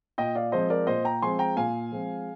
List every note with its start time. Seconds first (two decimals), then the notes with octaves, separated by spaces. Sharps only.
0.18 A#2 D#5 G5
0.35 D5 F5
0.52 F3 G#3 C4 C5 D#5
0.70 A#4 D5
0.87 A#2 C5 D#5
1.05 G5 A#5
1.22 F3 G#3 C4 G#5 C6
1.39 G5 A#5
1.56 A#2 F5 G#5
1.91 F3 G#3 C4